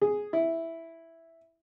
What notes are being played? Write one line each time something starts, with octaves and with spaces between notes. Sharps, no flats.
G#4
E4